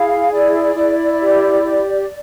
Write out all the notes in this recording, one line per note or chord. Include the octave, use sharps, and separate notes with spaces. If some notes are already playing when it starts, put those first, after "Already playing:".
Already playing: E4 G#4 F5
E4 D5
E4
G4
G4